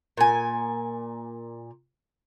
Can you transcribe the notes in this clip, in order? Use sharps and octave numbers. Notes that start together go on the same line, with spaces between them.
A#2 G#5